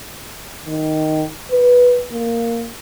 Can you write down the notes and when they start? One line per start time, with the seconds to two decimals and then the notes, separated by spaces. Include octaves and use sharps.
0.65 D#3
1.51 B4
2.12 A#3